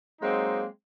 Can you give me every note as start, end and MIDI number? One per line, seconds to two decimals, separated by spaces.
0.21 0.63 54
0.21 0.63 56
0.21 0.63 58
0.21 0.63 60
0.21 0.63 63